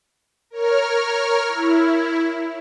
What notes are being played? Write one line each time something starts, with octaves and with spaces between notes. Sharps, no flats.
A#4 C#5 F6
E4